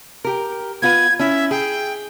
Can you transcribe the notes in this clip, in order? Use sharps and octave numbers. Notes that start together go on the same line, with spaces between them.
G4 A#4
B3 F4 B4 G#6
C#4 E4 E5
G#4 G5